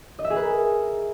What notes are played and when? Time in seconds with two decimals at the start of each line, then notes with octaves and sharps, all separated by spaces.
0.19 D#5
0.24 E5
0.30 G#4
0.36 B4
0.42 A#4